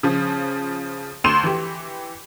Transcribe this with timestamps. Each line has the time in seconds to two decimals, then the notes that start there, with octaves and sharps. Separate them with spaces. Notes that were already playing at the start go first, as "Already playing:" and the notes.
0.03 C#3 F3
1.24 D2 C6 E7
1.43 E3 G4